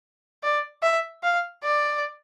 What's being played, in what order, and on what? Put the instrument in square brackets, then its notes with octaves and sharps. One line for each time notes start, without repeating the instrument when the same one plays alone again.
[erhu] D5
E5
F5
D5